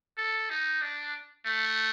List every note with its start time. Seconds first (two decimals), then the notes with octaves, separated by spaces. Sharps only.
0.18 A4
0.50 D#4
0.82 D4
1.45 A3